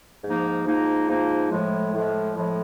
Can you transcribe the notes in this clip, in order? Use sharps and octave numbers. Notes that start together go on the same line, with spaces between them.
G#2 F3 A#3 D#4
G#2 F3 A#3 D#4
G#2 F3 A#3 D#4
A2 F3 G#3
A2 F3 G#3
A2 F3 G#3